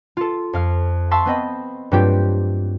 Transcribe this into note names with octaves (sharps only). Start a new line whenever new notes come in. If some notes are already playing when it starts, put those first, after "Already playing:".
F4 A4
F2 F5 F6
E5 F5 A5 C6 C#6 E6
B3 C4 D#5 B5
G2 F#3 A3 C4 F4 G4